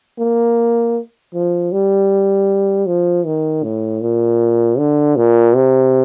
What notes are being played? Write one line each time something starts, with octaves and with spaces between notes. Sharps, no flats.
A#3
F3
G3
F3
D#3
A2
A#2
D3
A#2
C3